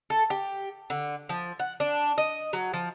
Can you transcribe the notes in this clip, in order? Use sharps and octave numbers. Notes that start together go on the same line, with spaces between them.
A4
G4
D3
F3
F#5
D4
D#5
F#3
F3